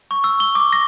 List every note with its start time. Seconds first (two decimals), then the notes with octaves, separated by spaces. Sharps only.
0.11 C#6
0.24 E6
0.40 G7
0.55 D6
0.73 A#6